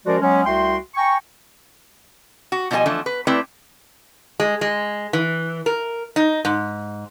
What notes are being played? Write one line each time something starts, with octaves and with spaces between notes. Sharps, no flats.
F3 G#3 C#4 F#4 A#4 D5
F#3 G#3 B3 C#4
C2 A3 F#4 G5 C6
G5 G#5 A#5 C#6
F#4
B2 F3 G3 F4 D#5 G#5
E3 F3 A3 D4
B4
A3 C4 E4 B4 D5
G#3
G#3
E3
A#4
D#4
G#2